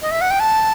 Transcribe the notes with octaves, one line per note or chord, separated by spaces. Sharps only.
D#5
E5
F#5
G5
A5